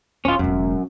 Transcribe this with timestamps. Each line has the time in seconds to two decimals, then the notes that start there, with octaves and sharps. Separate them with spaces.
0.25 D1 C#4 F4
0.39 E1 A1 F#2